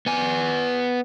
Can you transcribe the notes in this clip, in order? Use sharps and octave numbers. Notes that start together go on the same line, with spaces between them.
B3 G#5